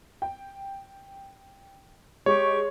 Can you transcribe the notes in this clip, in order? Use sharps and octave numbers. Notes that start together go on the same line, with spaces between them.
G5
G#3 G4 C#5 C#6